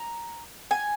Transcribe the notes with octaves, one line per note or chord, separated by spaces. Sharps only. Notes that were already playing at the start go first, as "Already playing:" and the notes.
Already playing: A#5
G#5